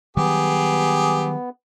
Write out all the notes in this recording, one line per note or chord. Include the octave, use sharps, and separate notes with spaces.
D#3 F#3 G3 B3 G4 G#4